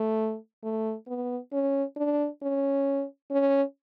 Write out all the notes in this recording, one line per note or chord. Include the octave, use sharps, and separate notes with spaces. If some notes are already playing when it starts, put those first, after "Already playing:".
Already playing: A3
A3
B3
C#4
D4
C#4
C#4